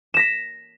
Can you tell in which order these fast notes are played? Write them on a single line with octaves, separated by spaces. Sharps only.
E7 A#6 B6